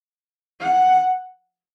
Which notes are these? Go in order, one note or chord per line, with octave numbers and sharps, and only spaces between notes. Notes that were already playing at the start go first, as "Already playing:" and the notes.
F#5